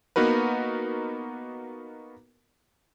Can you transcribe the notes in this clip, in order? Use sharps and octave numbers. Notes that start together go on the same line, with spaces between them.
A#3 B3 D#4 F#4 A#4 B4